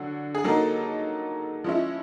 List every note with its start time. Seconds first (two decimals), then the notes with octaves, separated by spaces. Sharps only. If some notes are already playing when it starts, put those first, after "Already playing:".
Already playing: D3 F#3
0.35 G#4
0.44 F#3 A#3 D#4 A4
1.64 F3 G#3 C#4 E4